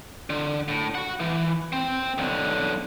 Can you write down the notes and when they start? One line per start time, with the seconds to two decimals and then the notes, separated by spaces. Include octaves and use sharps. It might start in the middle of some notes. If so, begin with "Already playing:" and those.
0.30 D3
0.69 A2
0.95 F#4 F#5
1.20 E3
1.73 C4
2.18 B1 D3